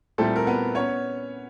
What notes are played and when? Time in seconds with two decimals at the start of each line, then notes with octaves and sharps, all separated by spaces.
0.18 A#2 G3 A3 C4 E4 A4
0.36 A#4
0.47 B3 B4
0.75 B3 C#4 C#5